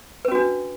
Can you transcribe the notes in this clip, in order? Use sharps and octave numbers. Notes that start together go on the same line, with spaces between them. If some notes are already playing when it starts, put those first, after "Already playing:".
C#4 D4 F#4 B4